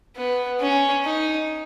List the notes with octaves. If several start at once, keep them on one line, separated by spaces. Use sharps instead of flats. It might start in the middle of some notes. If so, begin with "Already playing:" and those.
B3
C#4
D#4